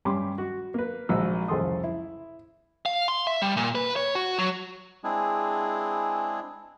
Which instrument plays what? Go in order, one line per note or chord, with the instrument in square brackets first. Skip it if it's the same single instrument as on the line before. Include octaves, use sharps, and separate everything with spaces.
[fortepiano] G2 C#4 G4 B5 C6 D6
F#4
A#3 A#4 B4
A#1 G#2 F#4 A#4 E6
C2 F2 C#3 A4 C6 D#6
E4
[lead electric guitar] F5
C6
E5
G3
A#2
B4
C#5
F#4
F#3
[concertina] G#3 C4 D4 E4 G#4